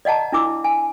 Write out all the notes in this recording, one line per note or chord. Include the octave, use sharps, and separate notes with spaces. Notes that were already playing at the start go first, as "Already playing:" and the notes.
D5 D#5 F#5 A5 A#5
D4 E4 D6 E6
G#5